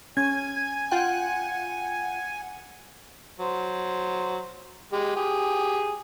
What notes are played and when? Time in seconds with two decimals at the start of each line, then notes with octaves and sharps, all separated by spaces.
0.17 C#4 G#5 G#6
0.91 F4 F#5 G5
3.39 F#3 C5
4.93 G#3 G4
5.16 G4 G#4